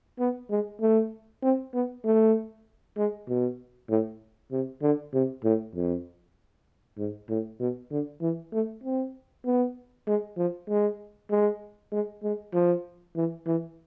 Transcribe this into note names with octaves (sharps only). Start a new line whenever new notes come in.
B3
G#3
A3
C4
B3
A3
G#3
B2
A2
C3
D3
C3
A2
F2
G#2
A2
B2
D3
E3
A3
C4
B3
G#3
F3
G#3
G#3
G#3
G#3
F3
E3
E3